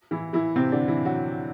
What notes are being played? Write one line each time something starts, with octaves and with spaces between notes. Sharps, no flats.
E3 E4
E3 E4
C3 C4
D3 D4
E3 E4
F#3 F#4